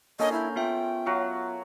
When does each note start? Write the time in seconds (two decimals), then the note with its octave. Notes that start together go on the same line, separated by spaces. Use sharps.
0.19 A#3 C#4 D4 A4 A#4 D#5
0.32 E4 A#5 G6
0.56 B3 F4 E5 G5
1.06 F#3 F#4 F5